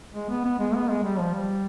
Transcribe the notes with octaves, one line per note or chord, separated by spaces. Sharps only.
G#3
B3
B3
G#3
B3
G#3
G3
F3
G3